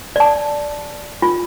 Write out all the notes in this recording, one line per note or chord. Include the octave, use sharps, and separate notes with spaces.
D5 A5
F4